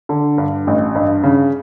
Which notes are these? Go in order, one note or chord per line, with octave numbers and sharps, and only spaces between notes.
D3
G2
A1
G2
C#3